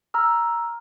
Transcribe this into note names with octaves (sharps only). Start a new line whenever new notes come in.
A#5 E6 F6